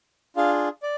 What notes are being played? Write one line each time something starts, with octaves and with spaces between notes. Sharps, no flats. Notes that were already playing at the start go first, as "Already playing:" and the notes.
D4 F4 G#4 F5
D5